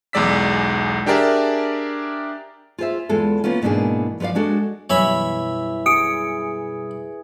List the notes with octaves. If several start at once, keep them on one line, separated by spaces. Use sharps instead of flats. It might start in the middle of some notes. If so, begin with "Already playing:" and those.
B1 E2 G#3 D5 E6 B6
D4 G4 G#4 A#4 D5 E5
F4 G#4 C5 E5
E2 G#3 F4 A4
A#3 B3 C#4 F4
G#2 B2 E3 A#3 D4 G#4
F3 F#4 B4 D5 F5
G#3 D4 F#4 A4
F#2 B2 E3 G3 C#5 E5 B5
G#4 D#6 C#7 D7